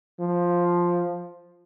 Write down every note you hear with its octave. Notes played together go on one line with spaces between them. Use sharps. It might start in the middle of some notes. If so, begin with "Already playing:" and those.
F3